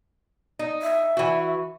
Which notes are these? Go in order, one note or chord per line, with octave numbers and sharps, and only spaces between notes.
D#4
E5
E3 F#4